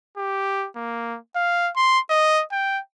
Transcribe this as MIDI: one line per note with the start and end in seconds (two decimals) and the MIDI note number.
0.17 0.67 67
0.76 1.18 58
1.36 1.70 77
1.77 1.99 84
2.10 2.43 75
2.52 2.80 79